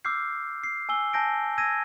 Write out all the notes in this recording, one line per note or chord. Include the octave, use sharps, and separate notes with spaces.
D6 E6 F6 G6 C7
C7
G#5 E6 G7
G#5 A5 G6 A#6 D7
E6 G#6 A#6 D#7